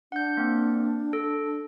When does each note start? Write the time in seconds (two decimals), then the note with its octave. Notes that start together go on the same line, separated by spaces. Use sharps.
0.12 D4 F#5 G6
0.37 A#3 C4
1.13 A4